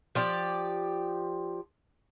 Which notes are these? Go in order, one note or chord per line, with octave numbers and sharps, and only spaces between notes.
F3 G4 D5